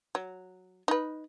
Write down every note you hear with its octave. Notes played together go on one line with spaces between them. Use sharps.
F#3
D#4 B4